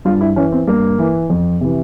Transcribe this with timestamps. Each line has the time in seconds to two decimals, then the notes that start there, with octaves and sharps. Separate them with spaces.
0.05 G2 F4
0.21 E4
0.36 E3 C#4
0.52 C4
0.67 G2 A#3
0.99 E3
1.30 F2
1.61 C3 E3